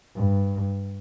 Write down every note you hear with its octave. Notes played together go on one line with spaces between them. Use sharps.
G2